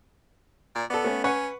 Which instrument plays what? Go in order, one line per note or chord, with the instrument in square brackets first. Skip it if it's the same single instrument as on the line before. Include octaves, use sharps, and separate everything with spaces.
[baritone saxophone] A#2
[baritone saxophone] B3 [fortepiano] A4 D5
[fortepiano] A3 C#4
[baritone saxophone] C#4 [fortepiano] B4 F#5 C#6